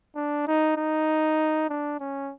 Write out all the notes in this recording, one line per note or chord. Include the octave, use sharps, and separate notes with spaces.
D4
D#4
D#4
D4
C#4